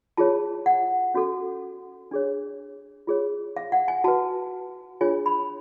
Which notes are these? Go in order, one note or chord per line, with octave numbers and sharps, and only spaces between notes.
F4 G#4 C#5 A5
F#5
C#4 F#4 A4
D4 G#4 C#5
F4 G#4 C#5
F5
F#5
G#5
F#4 B4 A5
D4 F4 G#4 C#5 G#5
B5